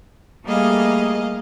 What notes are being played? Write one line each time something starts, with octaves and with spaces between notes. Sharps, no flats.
G3 A3 A#3 G#4 D#5 F5